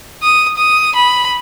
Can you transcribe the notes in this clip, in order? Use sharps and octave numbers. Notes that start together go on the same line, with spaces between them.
D#6
D#6
B5